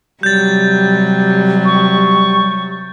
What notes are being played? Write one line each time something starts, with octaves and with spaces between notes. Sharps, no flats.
C3 F#3 G3 G6 A6
C#6